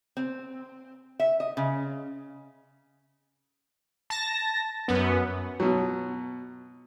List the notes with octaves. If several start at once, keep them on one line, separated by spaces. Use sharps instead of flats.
C4
E5
D#5
C#3
A5 A#6
F#2 B3
B2 F#3